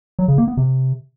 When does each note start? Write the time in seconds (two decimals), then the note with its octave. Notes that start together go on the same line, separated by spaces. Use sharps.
0.19 F#3
0.28 C#3
0.38 A#3
0.48 B3
0.57 C3